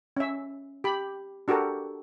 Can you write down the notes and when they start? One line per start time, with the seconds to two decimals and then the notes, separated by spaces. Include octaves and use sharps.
0.17 C#4 E5
0.84 G4 B5
1.48 D4 F#4 G4 A4 A#4